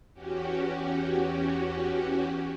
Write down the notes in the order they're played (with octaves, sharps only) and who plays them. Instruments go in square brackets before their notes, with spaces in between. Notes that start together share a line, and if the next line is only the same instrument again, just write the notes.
[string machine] E2 C#4 F#4 G4